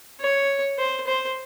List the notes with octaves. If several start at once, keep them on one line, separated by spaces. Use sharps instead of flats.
C#5
C5
C5